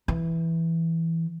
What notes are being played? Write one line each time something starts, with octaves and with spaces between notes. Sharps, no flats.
E3